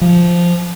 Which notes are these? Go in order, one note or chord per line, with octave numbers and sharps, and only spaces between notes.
F3